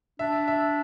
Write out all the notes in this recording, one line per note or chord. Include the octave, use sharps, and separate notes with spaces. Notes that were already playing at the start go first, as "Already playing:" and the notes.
D4 E5
E5